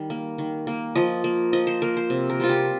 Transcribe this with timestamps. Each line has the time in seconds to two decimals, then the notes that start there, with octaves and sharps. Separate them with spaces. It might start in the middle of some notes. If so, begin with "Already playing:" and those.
Already playing: D#3 G3
0.10 A#3
0.38 D#3
0.67 A#3
0.95 F3 D#5
1.24 A#3
1.53 F3 D#5
1.67 C5
1.82 A#3 A#4
1.97 C5
2.10 C3
2.30 A#4
2.40 G3 C4 F4
2.49 G4